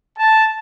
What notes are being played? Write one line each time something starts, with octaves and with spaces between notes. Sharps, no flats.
A5